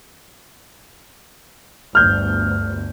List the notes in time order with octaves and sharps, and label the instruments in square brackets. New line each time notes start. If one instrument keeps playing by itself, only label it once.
[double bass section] G1 D2 [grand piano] F6 G6